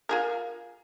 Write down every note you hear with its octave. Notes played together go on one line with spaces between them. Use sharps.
F4 G#4 A#4